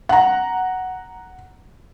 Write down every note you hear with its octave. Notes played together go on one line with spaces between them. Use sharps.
F#5 A#5